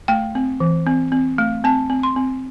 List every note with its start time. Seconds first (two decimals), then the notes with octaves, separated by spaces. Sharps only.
0.08 A3 G5
0.35 C4
0.60 E3
0.87 C4
1.12 C4
1.38 A3
1.64 C4 A5
1.90 C4
2.03 C6
2.16 C4